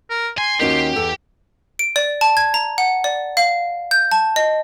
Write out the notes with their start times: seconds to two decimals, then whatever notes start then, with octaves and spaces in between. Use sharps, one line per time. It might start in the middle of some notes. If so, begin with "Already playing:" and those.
0.10 A#4
0.38 G#5 C6
0.60 D#2 D#3 C#4 F#4 G4
0.96 E2 A4
1.79 D7
1.96 D5
2.21 A5
2.37 G#6
2.54 A#5
2.78 F#5
3.04 D5
3.37 F5
3.91 G6
4.11 A5
4.36 D#5